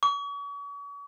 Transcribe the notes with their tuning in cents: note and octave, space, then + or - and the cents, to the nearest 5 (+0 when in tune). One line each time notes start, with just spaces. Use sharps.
C#6 +40